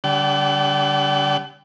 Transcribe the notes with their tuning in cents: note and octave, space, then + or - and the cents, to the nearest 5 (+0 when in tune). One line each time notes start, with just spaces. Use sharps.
D3 -30 G3 +0 F#5 +35